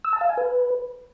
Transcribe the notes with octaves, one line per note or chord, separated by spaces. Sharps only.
E6
A5
F5
G#5
B4